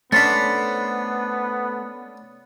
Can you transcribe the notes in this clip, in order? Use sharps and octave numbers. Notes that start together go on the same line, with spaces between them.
A3 B3 C#4 D4 C5 B5 A6 C#7